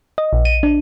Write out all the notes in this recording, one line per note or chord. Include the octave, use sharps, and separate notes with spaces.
D#5
A#1
D#7
D4